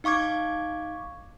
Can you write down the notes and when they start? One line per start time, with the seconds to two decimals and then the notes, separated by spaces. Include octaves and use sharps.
0.04 D#4 F5 C#6 D6 G#6